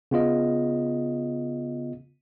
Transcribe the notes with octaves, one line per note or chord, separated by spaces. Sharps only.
C#3 B3 F4 D#5